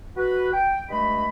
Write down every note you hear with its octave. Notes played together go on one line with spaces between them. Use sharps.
F#4 B4
G5
G2 G#3 A3 D#5 B5